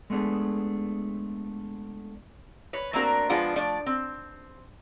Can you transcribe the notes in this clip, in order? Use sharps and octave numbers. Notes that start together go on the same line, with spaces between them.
G#3 A3 B3 D4 G#4
B4 C#5
A3 A#3 C4 D4 F#4 A#4
F3 G#3 B3 D4 F4
F3 A3 D4 D5
C4